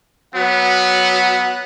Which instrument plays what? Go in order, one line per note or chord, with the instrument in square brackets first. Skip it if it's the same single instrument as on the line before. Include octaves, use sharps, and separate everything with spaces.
[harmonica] F#3 F#5 [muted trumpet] B3